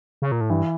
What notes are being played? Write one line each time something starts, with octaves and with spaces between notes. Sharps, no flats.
C#3
A#2
A2
G2 E3